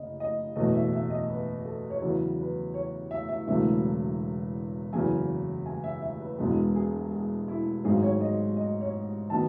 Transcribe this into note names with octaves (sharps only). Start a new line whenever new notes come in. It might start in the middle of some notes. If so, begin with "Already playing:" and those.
Already playing: F#1 C#3 D#5
D#5
F#1 E2 B2 A3 D#5
E5
E5
D#5
B4
A4
C#5
E2 C#3 F#3 B4
B4
C#5
E5
E5
E1 E2 C#3 F#3 A3 E5
F#1 E2 C#3 F#3 B3 G#5
G#5
E5
E5
B4
E1 E2 B2 G#3 B3
G#4
G#4
E4
G#1 G#2 F#3 G#4
C#5
D#5
D#5
C#5
D#3 F#3 B3 A5